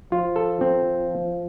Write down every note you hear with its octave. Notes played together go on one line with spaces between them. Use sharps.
F3 F4
A4
C4